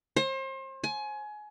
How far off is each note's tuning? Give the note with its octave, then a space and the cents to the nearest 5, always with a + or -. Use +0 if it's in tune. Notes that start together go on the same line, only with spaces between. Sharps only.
C5 +35
G#5 +25